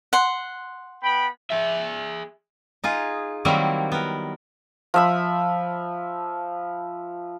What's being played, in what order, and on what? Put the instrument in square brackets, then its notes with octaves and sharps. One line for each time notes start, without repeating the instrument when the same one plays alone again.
[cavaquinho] F#5 C6
[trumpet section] B3 G5 B5
[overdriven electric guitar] G#4 E5
[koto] D#4 F4 G#4
D#3 F#3 G3 A#3 C4 E4
B3 A#4
[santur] F3 E5 B5